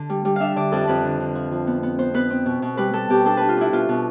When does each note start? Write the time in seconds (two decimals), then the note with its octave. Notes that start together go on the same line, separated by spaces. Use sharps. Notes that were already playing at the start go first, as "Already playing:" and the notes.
Already playing: D3 D4
0.10 G3
0.25 G3
0.36 D4 E5 F5
0.56 D3 D5
0.72 F2 A4
0.87 F2 B4
1.04 D3
1.20 D3
1.35 F3
1.52 F3
1.67 B3
1.83 B3
1.98 B3 C5
2.14 B3 B4
2.30 C4
2.46 B2
2.62 B2
2.77 G3 B4
2.93 G3 A4
3.10 B2 G4
3.25 D4 A4
3.37 D4 B4
3.49 F4
3.57 D4 E4
3.73 B2 F4
3.89 B2